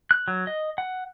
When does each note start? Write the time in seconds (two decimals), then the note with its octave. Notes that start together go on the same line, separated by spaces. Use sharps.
0.11 F#6
0.28 F#3
0.47 D#5
0.78 F#5